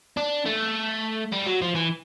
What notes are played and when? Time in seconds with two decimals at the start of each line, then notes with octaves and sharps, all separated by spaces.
0.17 D4
0.45 A3
1.33 G3
1.47 F#3
1.62 F3
1.75 E3